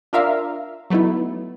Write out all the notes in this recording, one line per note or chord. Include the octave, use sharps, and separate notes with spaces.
D4 F4 A#4 E5 F5 A#5
F#3 A3 B3 D#4 E4